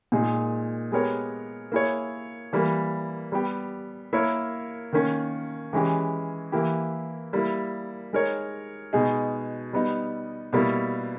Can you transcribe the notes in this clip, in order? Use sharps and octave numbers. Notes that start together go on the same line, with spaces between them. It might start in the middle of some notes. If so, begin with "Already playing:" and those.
A#2 G#3 D#4 G#4
G#3 B3 G4 A#4 C#5
A#3 E4 G#4 C#5
E3 G3 A#3
G3 B3 G4
A#3 E4 A#4 C#5
D#3 A#3 C#4
E3 G#3 C#4 G4
E3 A#3 E4 G4
G3 A#3 E4
G#3 D#4 A#4 C#5
B2 G#3 D#4 G#4
G3 B3 D#4
B2 G3 A#3 E4